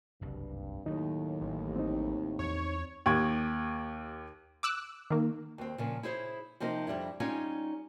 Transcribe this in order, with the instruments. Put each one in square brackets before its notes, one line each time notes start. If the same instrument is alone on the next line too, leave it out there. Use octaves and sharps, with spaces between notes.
[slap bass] F#1 C2 [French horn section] G2
[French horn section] D#2 A2 [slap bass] D#3 F#3 [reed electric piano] D#4
[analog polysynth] A1
[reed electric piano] C4 D#4
[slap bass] E2 [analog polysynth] C#5
[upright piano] D#2 G4 C#6 G#6
[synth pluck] D6 E6 F#6
D#3 A#3
[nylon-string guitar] D#2 C4
A#2 C#3 F3
E4 G#4 C5 C#5
C3 F3 A#3 C4 D#4
F2 G3 D4 E4
G3 C#4 D#4 F4 C#5 G#5